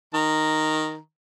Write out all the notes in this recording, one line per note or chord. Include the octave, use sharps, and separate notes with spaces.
D#3 A#5